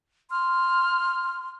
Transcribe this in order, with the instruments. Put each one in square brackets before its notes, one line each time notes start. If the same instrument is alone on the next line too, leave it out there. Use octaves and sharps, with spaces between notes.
[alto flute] C6 [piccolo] F6